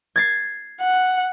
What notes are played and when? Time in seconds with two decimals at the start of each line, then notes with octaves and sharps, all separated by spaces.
0.16 G#6 A6 C7
0.80 F#5